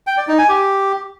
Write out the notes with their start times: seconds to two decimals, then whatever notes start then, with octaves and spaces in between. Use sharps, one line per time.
0.07 G5
0.17 D5
0.28 D#4
0.38 G#5
0.49 G4